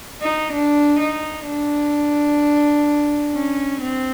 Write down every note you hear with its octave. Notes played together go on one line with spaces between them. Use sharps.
D#4
D4
D#4
D4
C#4
C4